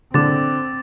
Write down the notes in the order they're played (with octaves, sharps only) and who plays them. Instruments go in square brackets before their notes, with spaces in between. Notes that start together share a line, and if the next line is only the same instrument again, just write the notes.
[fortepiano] D3 [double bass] C4 [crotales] D6 A6